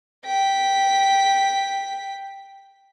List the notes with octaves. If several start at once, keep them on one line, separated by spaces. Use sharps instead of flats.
G5 B6